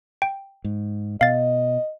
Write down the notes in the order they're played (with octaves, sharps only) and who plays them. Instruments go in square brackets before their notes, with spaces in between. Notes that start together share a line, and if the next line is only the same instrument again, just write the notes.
[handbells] G5
[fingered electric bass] G#2
[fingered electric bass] B2 [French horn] D#5 [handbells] F5 A6